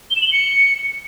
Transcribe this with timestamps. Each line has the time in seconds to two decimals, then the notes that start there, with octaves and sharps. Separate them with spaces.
0.10 G7
0.16 E7
0.21 F#7
0.27 G7
0.32 C#7